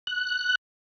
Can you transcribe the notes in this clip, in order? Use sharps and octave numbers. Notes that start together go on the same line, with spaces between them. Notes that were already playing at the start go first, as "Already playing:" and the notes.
F#6